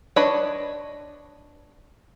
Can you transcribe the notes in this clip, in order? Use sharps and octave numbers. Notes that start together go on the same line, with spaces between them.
D4 B4 C#5 D#5 B5